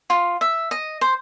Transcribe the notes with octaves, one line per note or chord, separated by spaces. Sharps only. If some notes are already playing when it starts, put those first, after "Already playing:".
F4
E5
D#5
C5